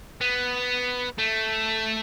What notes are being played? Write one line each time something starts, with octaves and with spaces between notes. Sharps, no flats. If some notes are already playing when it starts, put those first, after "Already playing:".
B3
A3